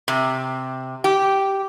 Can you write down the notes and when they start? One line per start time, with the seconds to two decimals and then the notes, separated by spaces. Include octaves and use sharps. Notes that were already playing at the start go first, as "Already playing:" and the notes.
0.08 C3
1.04 G4